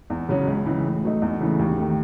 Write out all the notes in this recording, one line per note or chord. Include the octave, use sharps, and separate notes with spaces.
E2
C#3 F#3 C#4 F#4
C#2
C#3 E3
A2
F#3 A3 D#4
E2
C#3 E3 A3
D#2
D#3 A3